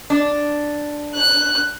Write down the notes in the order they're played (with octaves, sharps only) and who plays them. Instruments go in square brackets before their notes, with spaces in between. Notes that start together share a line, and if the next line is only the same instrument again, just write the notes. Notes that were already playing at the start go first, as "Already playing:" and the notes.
[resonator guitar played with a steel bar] D4
[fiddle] F#6